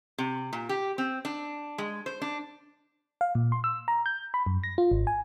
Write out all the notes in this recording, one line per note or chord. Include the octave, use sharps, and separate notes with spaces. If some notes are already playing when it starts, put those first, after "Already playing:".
C3
A#2
G4
C4
D4
G#3
C5
D4
F5
A#2
C6
E6
A#5
G6
B5
F#2
A#6
F4
G#1
G#5